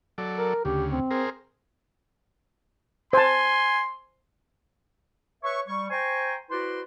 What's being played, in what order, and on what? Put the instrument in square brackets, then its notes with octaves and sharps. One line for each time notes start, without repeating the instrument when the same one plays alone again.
[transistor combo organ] F#3 A4 D5
[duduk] A#4
[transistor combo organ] D2 C#3 [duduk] G4
[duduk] C4
[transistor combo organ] G#4 A#4 C5
[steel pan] C5 A5 [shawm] G#5 [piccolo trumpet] C6
[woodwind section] B4 C#5 E5 C#6
G3 C#6
C5 G5 G#5 A#5 C6 C#6
E4 F#4 B4 C5 D5 C6